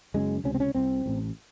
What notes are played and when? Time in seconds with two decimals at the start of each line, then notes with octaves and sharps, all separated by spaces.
0.14 F#1 F#2 C#3 G#3
0.44 C#2 C3 C#4
0.54 C4
0.60 C#4
0.75 C2 C3 C4
1.06 A1 A2